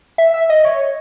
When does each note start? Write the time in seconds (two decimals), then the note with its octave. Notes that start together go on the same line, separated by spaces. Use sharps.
0.18 E5
0.34 E5
0.50 D#5
0.64 C#5